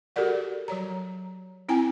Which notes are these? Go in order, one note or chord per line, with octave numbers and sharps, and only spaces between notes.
F#4 G4 A4 A#4 D5 F#5
F#3 C#5 A#5
C4 E4 G5 G#5 A#5